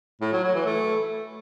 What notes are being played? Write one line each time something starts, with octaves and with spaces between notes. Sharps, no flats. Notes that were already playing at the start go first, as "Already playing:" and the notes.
A2
F#3
F#3
E3
A3